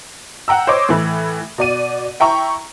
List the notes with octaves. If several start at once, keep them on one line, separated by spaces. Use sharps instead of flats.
F#5 G5 A#5 E6
C5 C#5 D#5 D6
A2 E3 B5
B2 D5 D#7
E4 G5 A#5 C#6